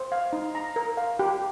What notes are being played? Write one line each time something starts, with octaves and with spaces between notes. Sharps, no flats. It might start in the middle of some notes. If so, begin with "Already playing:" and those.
Already playing: C5
F5
D#4
A#5
A#4
F5
G4